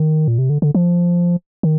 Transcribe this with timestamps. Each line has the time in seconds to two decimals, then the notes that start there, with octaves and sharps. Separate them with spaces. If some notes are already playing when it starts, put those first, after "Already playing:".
Already playing: D#3
0.28 A#2
0.38 C3
0.50 D3
0.62 D3
0.75 F3
1.63 D#3